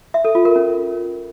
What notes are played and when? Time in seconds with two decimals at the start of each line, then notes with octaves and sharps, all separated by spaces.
0.14 E5
0.25 A4
0.35 F4
0.45 A#4
0.56 C#4